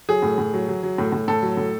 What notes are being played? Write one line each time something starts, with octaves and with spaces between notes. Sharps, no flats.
F#3 G#4
A2
A2
F#3
F#3
F#3
A2
A2
A2 A4
F#3
A2